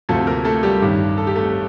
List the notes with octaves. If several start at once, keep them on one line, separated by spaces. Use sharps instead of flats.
D2 C3 F3 A3 A4
A#3 A#4
A3 A4
G3 G4
A1 G2 D#3
A4
G4
A3 A4